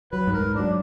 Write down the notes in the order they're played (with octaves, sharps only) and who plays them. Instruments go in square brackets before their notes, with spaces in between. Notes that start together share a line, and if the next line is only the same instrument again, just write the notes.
[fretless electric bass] F#3 [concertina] B4
[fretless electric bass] G#2
[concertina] A#4
[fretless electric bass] G#2
[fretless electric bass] F#3 [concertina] D4